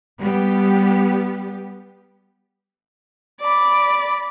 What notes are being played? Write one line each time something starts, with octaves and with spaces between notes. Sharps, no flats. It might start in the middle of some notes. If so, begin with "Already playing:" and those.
G3 B3 G4
D5 B5